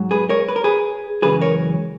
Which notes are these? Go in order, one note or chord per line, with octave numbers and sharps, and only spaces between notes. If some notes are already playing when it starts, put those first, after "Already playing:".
Already playing: G#2 F#3
G#4 B4
A#4 C#5
B4
A#4
G#4 B4
F#2 C#3 E3 G#3 G#4 B4
A#4 C#5